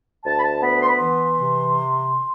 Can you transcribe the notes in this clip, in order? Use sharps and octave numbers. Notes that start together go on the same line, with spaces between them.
D2 A5
B5
A5
B3 B5
C6
B5
E3 C6
C3